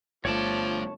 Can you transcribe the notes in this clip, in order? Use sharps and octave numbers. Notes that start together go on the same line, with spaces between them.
G1 G2 F3 A3 C#5 D5 A5